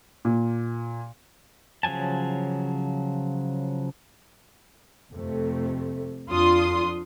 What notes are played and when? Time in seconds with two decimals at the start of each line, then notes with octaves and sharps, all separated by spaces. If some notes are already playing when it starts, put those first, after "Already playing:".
0.25 A#2
1.83 C#3 F3 F#3 G#5 A5
5.11 F2 C3 A3
6.29 F2 D4 F4 C6 D#6